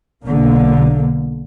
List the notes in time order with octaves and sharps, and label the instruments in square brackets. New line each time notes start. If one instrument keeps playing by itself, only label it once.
[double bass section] B1 D3 A#3